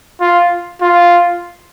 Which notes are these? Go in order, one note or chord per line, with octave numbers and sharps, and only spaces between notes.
F4
F4